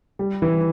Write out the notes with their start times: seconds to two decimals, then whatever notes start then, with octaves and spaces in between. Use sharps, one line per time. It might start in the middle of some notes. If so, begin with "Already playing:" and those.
0.19 G3
0.42 E3